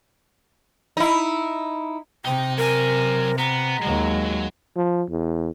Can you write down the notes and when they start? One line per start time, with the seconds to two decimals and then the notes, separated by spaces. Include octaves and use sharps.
0.97 D#4 E4
2.25 C3 D#4 G5
2.58 F#3 A#4 G#5
3.38 B3 A#5
3.82 D#2 F#3 G#3
4.76 F3
5.10 E2